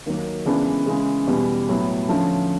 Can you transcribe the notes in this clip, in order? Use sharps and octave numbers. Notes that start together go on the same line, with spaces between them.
D#2 D#3 F#3 A#3
C#3 E3 G#3 B3 D4
C#3 E3 G#3
E2 B2 G3
A2 F#3 B3
D2 D3 F3 A3 C#4